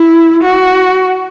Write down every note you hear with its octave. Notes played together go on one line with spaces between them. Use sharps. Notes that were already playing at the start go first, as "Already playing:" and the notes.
Already playing: E4
F#4